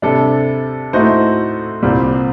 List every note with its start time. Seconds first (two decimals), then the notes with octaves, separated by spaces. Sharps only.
0.02 C3 G3 D4 A4
0.93 A2 A3 D#4 F#4 C5
1.83 C2 A#2 G3 C4